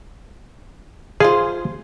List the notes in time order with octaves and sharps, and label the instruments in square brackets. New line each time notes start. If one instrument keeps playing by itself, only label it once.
[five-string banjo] F4 C5 F5 [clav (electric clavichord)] G#4